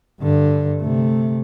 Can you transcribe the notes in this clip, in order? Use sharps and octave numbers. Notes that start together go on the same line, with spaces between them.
G2 D3
C3 A3